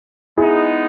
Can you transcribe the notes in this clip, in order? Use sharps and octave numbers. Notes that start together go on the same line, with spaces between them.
G#3 B3 D#4 E4 G#4